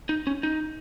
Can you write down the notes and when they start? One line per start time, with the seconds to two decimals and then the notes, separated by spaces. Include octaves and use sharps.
0.09 D#4
0.27 C#4
0.43 D#4